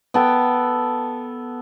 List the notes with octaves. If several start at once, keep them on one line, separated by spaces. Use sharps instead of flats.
B3 A4 G5